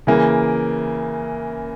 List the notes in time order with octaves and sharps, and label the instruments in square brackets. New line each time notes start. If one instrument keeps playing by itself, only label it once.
[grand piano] C#3 E3 A#3